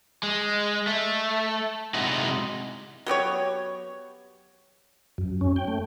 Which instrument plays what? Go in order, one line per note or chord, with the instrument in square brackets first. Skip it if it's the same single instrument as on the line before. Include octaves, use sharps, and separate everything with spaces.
[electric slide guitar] G#3
A3
C3 G#3 D#4 E4 F#4
[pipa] F#3 B3 G4 C#5
[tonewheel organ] F#2
C#4
G5
A3